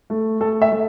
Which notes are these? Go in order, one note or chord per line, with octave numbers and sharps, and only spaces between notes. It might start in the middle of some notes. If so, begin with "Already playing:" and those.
A3
A3 A4
E5
A3